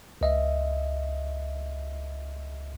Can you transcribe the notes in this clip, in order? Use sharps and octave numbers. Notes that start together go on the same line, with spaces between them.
C#2 D#5 E5